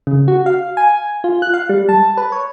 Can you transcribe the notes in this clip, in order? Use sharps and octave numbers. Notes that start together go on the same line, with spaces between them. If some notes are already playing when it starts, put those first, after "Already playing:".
C#3
F#4
F5
G#5
F4
F#6
F5
G3
A5
B4
C#5